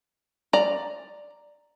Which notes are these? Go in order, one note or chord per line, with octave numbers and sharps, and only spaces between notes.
D5 A#5